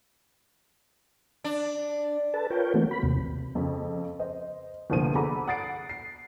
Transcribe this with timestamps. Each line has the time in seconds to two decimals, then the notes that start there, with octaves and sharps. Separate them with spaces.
1.44 D4
2.34 A4 B4 A5
2.50 F4 A#4 B4 C#5 G5
2.74 E3 A3 A#3 C4 F#4
2.91 B5
3.03 D#2 C3
3.55 F2 C#3
4.19 C5 D#5
4.90 G1 C2 A#2 F3 D#7
5.15 G#4 A4 F#5 A#5 B5 D6
5.48 F#5 D#6 A6 C7 D7
5.89 C7